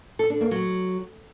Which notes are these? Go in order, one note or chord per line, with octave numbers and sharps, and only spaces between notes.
A4
D4
A#3
F#3